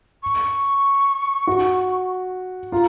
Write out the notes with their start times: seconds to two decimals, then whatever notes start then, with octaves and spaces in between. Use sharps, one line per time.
0.22 C#6
1.47 F#4
2.72 F4 A#5